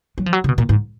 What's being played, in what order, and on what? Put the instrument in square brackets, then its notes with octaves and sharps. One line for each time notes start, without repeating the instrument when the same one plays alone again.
[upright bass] F#3
F3
F#3
C#3
B2
A#2
G#2